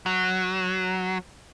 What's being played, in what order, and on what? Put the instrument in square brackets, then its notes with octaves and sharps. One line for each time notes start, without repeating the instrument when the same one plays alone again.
[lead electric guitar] F#3